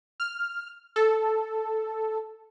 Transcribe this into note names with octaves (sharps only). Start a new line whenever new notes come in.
F6
A4